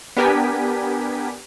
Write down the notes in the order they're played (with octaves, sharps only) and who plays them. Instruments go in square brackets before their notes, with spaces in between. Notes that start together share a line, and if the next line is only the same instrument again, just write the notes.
[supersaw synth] B3 D4 G4 A#4 G#5 B6